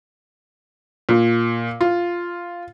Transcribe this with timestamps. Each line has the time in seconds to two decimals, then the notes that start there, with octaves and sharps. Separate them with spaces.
1.09 A#2
1.81 F4